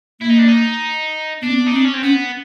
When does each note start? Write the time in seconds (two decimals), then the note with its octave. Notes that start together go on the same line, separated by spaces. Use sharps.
0.21 A#3 E4
0.29 D#4
0.39 D4
0.48 D#4
1.42 B3 D4
1.49 C4
1.57 B3
1.67 D#4
1.72 C4 D4
1.85 C#4
1.94 C4
2.03 B3 C#4